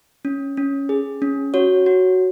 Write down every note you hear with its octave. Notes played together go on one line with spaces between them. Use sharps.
C#4
C#4
G#4
C#4
F#4 C#5
F#4